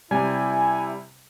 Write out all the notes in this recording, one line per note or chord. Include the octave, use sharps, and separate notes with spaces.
C3 G3 E4 G#5